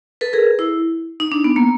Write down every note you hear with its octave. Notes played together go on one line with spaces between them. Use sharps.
A4 B4
G#4 A#4
E4
D#4
D4
B3
A#3